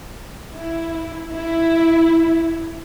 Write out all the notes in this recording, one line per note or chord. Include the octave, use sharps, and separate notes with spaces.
E4
E4